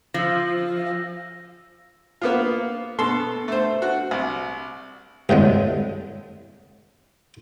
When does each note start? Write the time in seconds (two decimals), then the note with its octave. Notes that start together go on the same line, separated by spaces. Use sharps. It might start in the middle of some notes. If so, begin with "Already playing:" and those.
0.14 F3 E6 A#6
2.21 A#3 B3 F4
2.98 B2 A4 C6
3.48 A3 C5
3.82 F#4
4.11 C2
5.29 C2 A2 D3 G#3